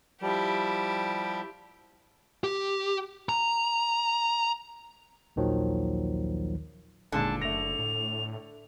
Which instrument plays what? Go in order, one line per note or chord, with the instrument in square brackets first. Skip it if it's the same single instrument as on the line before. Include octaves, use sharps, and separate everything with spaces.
[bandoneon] F3 G3 [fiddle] E4 G4
[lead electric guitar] G4
A#5
[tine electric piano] A#1 D#2 D#3 F3 F#3
[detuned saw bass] G1 [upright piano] D#2 A#2 G#3 [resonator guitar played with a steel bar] D3 [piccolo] A5
[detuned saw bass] F#1 [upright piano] A3 A#6 [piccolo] F7
[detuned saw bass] A2